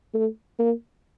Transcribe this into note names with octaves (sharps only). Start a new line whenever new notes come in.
A3
A#3